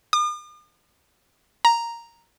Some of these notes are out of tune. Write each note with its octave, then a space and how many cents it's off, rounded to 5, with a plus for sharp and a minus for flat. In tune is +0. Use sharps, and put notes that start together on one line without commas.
D#6 -45
A#5 +0